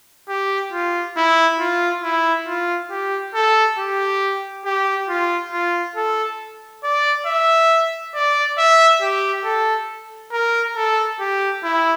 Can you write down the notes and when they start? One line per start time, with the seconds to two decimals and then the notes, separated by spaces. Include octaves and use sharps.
0.29 G4
0.73 F4
1.17 E4
1.60 F4
2.03 E4
2.47 F4
2.91 G4
3.34 A4
3.78 G4
4.65 G4
5.09 F4
5.52 F4
5.96 A4
6.83 D5
7.26 E5
8.15 D5
8.58 E5
9.01 G4
9.45 A4
10.32 A#4
10.76 A4
11.20 G4
11.64 E4